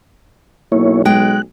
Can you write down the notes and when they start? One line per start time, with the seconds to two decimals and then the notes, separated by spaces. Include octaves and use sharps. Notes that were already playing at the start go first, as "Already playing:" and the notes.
0.72 B1 A#3 E4 C#5
1.05 G#3 G5 F#6